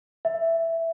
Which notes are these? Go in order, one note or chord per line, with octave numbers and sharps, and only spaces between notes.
E5